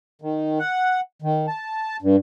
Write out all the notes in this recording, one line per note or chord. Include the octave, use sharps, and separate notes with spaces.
D#3
F#5
D#3
A5
G2